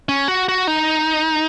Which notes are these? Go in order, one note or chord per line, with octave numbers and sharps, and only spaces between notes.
C#4
F#4
F#4
D#4